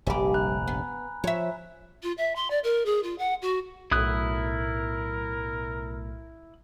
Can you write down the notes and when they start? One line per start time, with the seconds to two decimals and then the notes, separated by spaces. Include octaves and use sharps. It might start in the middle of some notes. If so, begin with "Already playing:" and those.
0.07 F1 A#1 G2 G3 G4 G#5 B5
0.34 A#5 B5 F#6
0.68 B3
1.24 F3 C#5 E5
2.02 F4
2.17 E5
2.35 C6
2.50 D5
2.63 A#4
2.85 G#4
3.03 F4
3.18 F#5
3.41 F#4
3.91 B1 A2 E4 A#4 D#6 F#6